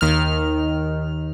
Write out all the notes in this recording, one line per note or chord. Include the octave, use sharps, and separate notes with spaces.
D#2 D#3 F6